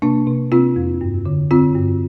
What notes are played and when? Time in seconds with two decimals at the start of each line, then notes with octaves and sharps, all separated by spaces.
0.02 C3 A#3 D4
0.27 C3
0.52 C3 C4 F4
0.76 F2
1.01 G2
1.26 D3
1.51 D3 C4 F4
1.75 G2